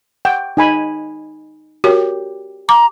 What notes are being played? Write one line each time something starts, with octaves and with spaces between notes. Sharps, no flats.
F#5 G5
D#4 G#5 B5
F#4 G4 A#4 C#5
A#5 D6